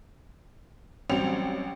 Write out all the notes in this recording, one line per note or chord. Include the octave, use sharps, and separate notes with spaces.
A1 F#3 G3 C4 G5 F7